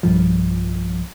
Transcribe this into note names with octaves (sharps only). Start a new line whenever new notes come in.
B1 G2 F3